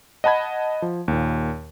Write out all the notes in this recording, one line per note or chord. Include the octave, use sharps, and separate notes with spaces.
D#5 F#5 A5 B5 G#6
F3
D#2 A#2